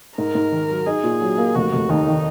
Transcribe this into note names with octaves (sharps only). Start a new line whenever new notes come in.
G#2 A#4
G#2
D#3
F#3
D#4 G#4
A#2
F#3
A#3
F1 F#4
F1
D#2 D#4
D#3